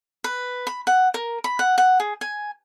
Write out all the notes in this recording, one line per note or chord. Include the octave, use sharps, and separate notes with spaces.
B4
B5
F#5
A#4
B5
F#5
F#5
G#4
G#5